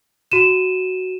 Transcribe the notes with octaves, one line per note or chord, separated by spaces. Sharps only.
F#4 D#7 E7